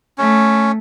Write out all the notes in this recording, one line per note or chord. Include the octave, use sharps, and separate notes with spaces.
A3 C#4